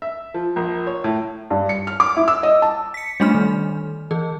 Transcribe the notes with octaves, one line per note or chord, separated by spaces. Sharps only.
E5
F3
A#1
C#5
A2
G2
C#7
F6
D6
E4
E6
D#5
A5
B6 C#7
G3 A3 D4 B5 F6
D#3
E3 G#4